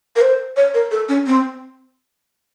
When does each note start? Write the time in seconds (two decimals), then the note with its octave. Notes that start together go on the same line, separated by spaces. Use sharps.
0.16 A#4
0.21 C5
0.56 C#5
0.74 A#4
0.91 A4
1.09 C#4
1.26 C4